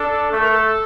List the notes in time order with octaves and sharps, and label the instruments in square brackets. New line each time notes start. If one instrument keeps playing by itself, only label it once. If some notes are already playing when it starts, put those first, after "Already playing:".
Already playing: [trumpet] D4 [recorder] A4
[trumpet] A3 [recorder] A4
[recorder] A#4
A4